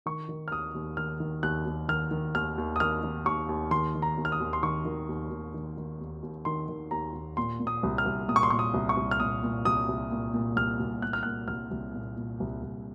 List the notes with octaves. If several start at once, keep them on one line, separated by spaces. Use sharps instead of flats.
D#3 C#6
D#3
F6
D#2 D#6
D#2
D#3 F6
D#3
D#2 F#6
D#2
D#3 F6
D#3
D#2 F6
D#2
D#6
D#3 F6
D#3
D#2 C#6
D#2
D#3 C6
D#3
A#5
D#2
F6
D#6
D#2
C6
D#3 C#6
D#3
D#2
D#2
D#3
D#3
D#2
D#2
D#3 C6
D#3
D#2 A#5
D#2
A#2 C6
A#2
D#6
C2
F6
C2
A#2 D#6
C#6
C6
A#2 C#6
D#6
C2
C#6
C2
F6
A#2 D#6
A#2
C2 D#6
C2
A#2
A#2
C2 F6
C2
A#2 F#6
F6
A#2 F#6
C2 F6
C2
A#2
A#2
C2
C2